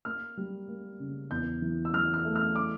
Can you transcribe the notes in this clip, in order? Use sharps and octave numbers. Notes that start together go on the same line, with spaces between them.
A#3 F6
G3
A#3
C#3
E2 G6
E3
E6
E3 F6
F6
A3
F6
D6